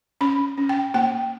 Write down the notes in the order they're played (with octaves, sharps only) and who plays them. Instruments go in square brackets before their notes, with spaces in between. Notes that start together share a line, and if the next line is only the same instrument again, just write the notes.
[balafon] C#4 B5
C#4
G5
A#3 G5